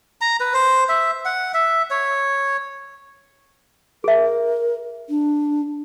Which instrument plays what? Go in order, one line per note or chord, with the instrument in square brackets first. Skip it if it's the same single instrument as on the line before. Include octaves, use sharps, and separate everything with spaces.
[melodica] A#5
B4
C5
E5
F#5
E5
C#5
[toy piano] G#4 E5 [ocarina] A#4
[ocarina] D4